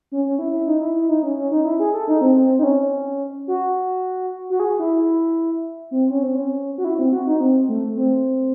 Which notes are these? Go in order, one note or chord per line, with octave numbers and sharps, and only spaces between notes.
C#4
C#4
E4
E4
D#4
E4
E4
D#4
C#4
C#4
D#4
E4
G#4
A4
D#4
C4
C4
D#4
C#4
F#4
F#4
G#4
E4
E4
C4
C#4
C4
C#4
F#4
E4
C4
F#4
D#4
C4
A3
C4